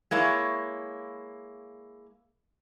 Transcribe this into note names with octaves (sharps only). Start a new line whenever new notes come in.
G#3 A#3 E4 C#5